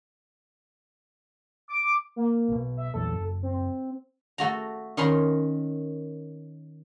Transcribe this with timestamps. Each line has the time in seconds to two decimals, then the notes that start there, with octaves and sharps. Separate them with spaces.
1.69 D6
2.16 A#3
2.48 B1 B2
2.77 E5
2.94 A#1 E2 F#3 A4
3.13 F#1
3.43 C4
4.38 A3 F#4 A#5
4.97 D#3 C#4 D#4 A#4 B5 C6